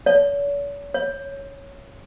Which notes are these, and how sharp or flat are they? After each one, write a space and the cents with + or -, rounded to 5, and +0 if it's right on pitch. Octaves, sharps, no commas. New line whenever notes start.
C#5 +45
C#5 -5